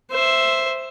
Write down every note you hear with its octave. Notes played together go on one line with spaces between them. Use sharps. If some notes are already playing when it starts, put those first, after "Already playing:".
C5 E5